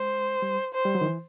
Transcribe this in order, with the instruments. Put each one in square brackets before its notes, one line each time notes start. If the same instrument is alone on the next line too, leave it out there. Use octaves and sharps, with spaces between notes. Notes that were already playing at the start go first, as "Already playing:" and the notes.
Already playing: [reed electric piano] G#3 [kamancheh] C5
[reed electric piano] G3
[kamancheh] C5
[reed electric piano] G3
F#3
D#3
E3